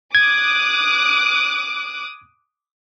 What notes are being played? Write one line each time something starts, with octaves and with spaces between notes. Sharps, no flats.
D6 D#6 F#6 G#6